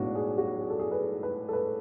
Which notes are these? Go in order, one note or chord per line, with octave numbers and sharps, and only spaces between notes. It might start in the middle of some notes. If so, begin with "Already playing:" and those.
Already playing: B1 A2 G#3 B3 D4 F#4
G#4
F#4
G#4
A4
G#4
B4
B4
A4
B4